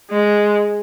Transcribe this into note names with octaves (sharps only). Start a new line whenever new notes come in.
G#3